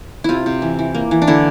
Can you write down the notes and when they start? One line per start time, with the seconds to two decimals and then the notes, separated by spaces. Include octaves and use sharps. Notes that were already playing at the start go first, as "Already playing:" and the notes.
0.24 C3 E4 F4
0.46 C3
0.62 E3
0.79 E3
0.95 A#3
1.11 E3
1.22 D4
1.27 D3 E4